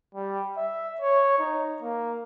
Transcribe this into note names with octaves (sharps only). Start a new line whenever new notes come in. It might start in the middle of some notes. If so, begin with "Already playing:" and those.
G3
E5
C#5
D#4
A#3